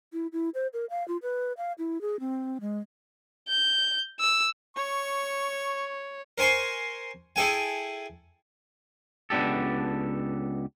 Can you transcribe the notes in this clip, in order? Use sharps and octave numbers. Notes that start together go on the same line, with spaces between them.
E4
E4
C5
A#4
F5
F4
B4
F5
E4
G#4
C4
G#3
G6
E6
C#5 C#6
A#4 C5 G#5 C6 C#6
E4 G#4 A4 G5 G#5
C#2 B3 C4 D4 G4 A4